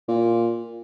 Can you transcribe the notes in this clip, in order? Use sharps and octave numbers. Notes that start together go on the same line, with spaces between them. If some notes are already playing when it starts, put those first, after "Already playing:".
A#2